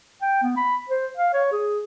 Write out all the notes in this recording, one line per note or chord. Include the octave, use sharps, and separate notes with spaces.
G5
B3
B5
C5
F5
C#5
G#4